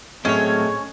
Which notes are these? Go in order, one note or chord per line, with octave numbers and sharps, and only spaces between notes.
A2 F#3 G#3 A3 C4 C#4 C#5